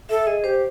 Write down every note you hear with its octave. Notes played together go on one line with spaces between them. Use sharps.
A4 E5
G#4 D#5
G4 C5